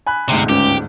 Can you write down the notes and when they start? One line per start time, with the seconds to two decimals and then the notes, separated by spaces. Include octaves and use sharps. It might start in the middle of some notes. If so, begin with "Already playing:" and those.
0.07 G#5 B5 F#6
0.29 G1 D2 G#2 C3
0.49 C#2 G4